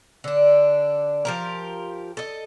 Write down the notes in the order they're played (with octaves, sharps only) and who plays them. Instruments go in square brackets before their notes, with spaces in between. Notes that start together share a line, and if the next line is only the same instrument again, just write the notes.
[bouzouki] D3 D4
F3 G4 A#4
A4 D#5